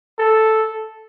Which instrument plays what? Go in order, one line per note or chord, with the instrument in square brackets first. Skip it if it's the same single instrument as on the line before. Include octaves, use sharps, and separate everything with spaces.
[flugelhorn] A4